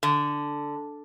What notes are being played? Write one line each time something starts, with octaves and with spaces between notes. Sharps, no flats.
D3